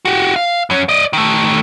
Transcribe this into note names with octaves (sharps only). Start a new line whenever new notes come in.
F#4 G4
F5
F#2 C#4
D5 D#5
D#3 A3